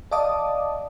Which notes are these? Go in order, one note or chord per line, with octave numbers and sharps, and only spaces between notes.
D5 D#5 F5 A5 D6 D#6